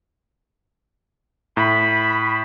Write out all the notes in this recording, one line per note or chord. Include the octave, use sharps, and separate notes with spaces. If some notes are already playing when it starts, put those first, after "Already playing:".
A2 B5